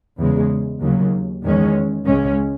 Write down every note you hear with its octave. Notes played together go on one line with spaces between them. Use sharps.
E2 C#3 G#3
D#2 C#3 F#3
E2 D#3 G#3 C#4
C#2 C#3 G#3 C#4